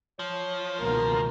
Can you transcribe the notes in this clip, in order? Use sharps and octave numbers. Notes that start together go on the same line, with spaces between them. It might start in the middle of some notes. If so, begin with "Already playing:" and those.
F3 C#5
C#2 B2 D#3 A#3 A#4